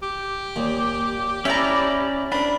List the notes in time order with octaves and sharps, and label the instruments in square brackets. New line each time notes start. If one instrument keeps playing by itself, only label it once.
[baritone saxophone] G4
[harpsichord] D#2 A#2
[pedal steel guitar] C#4 D5 [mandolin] E4 A#5 [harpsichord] C#5
[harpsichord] C4 A#4 [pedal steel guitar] D4 [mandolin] B5